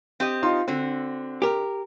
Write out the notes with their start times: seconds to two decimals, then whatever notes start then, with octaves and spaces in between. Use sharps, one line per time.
0.20 C4 G4 D#5
0.43 D#4 F4 C6
0.68 D3 C4 F#4
1.42 G4 A#4